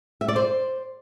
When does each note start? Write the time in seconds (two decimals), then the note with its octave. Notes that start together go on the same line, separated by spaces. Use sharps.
0.21 E5
0.28 D5
0.36 C5